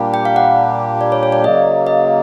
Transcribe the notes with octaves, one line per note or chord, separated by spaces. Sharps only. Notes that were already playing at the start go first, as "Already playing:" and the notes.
Already playing: A#2 G3 A#3 D4 G4
G5
F5
F#5
D5
C#5
C#5
D5
C#3 F#3 A#3 D#5
D#5